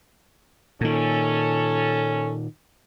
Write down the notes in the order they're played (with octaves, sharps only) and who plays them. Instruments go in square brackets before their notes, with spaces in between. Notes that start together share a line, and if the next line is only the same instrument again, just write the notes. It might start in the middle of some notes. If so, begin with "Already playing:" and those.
[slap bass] A#2 D#3 [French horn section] C#4 A4